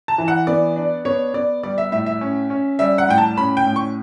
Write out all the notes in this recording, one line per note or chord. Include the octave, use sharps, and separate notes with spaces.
A5
E3
F#5
B3 D5
D4
B3 C#5
B3 D5
G3 D5
E5
A2 E5
E5
C#4
C#4
G3 E5
F#5
A2 G5
A5
C#4 B5
G5
A2
C#6